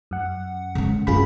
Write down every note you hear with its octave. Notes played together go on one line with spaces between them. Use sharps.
F#2 F#5
C#3 G#3
F#2 A#3 F4 G#4 B5